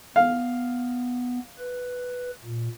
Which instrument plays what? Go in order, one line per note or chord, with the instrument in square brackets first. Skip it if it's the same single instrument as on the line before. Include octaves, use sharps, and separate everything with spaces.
[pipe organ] B3 [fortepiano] F5
[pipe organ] B4
A#2